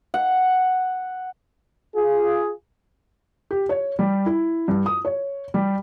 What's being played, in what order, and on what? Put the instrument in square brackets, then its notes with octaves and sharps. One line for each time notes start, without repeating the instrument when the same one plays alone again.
[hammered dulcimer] F#5
[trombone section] F4 G#4
[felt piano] G4
C#5
G3
E4
G2
D#6
C#5
G3